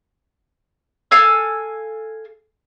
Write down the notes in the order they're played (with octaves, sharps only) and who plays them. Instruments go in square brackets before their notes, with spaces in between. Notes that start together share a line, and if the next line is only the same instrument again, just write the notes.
[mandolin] A4 F5 G#5 E6